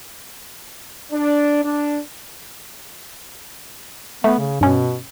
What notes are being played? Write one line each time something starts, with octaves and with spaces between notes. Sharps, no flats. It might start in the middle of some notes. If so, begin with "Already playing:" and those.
D4
D4
A3 B3
C#3
G2 B2 C#4